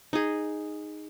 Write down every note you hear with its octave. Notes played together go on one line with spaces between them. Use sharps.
D#4 G#4